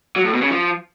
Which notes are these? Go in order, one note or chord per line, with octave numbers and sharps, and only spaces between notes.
F#3
A2
B2
C#3
F3